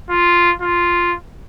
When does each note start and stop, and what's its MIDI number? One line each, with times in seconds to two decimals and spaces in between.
0.10 0.52 65
0.62 1.14 65